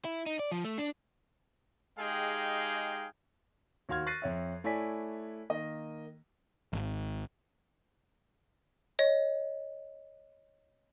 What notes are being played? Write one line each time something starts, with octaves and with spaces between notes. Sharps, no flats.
E4
D#4
D5
F3
A3
D4
G#3 D#4 G4 G#4 F5 G5
D#2 F#4 F5 C6 F6 G#6
C#6 F#6 A6 A#6 C7 D#7
F2 C#5 E5
A3 E4 C#5 D5 G#5 B6
D#3 A#3 D#5
G#1
C#5 D#5